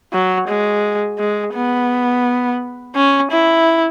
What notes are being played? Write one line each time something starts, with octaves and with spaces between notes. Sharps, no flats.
F#3
G#3
G#3
B3
C#4
E4